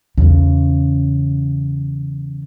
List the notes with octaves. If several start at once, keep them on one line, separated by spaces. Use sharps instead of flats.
E2 C#3